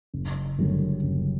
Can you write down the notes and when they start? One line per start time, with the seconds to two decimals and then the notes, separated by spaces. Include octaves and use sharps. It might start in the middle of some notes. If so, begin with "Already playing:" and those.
0.13 F#1
0.58 F#2 D3 G3
1.03 F#1